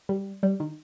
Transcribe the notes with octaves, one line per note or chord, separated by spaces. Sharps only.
G3
G3
D#3